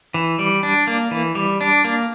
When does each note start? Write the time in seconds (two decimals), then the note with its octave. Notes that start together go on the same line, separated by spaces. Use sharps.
0.14 E3
0.39 G3
0.63 D4
0.87 A#3
1.11 E3
1.35 G3
1.61 D4
1.85 A#3